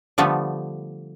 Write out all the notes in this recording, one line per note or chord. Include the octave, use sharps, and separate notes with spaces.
D3 F3 G3 A3 B3